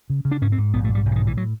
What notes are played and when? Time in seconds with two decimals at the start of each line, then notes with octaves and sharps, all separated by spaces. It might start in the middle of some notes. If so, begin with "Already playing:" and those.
0.10 C#3
0.25 C#3
0.31 D4
0.41 G#2 C#4
0.52 C4
0.58 G#2
0.74 A#1 B3
0.84 A3
0.89 G#2
0.95 G3
1.06 B1
1.12 E3
1.16 D#3
1.21 A2
1.27 E3
1.37 F#3